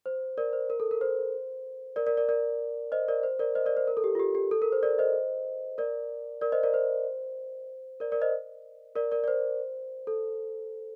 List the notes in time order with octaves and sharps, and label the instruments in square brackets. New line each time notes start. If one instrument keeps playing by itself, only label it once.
[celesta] C5
A#4 D5
C5
A#4
A4
A#4
C5
A#4 D5
A#4 D5
A#4 D5
A#4 D5
C5 D#5
A#4 D5
C5
A#4 D5
C5 D#5
A#4 D5
C5
A#4
A4
G4
F4
G4
G4
A4
A#4
C5
A#4 D5
C5 D#5
A#4 D5
A#4 D5
C5 D#5
A#4 D5
C5
A#4 D5
A#4 D5
C5 D#5
A#4 D5
A#4 D5
D5
C5
A4